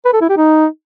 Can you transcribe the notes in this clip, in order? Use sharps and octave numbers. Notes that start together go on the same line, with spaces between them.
B4
A4
E4
G4
D#4